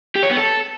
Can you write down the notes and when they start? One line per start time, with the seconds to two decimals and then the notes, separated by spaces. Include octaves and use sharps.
0.16 G4
0.23 C#5
0.30 B3
0.37 A4